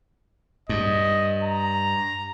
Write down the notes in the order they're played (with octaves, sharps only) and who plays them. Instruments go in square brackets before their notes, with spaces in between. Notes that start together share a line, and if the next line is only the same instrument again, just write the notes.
[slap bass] G2 [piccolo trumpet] D#5
[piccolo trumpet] A#5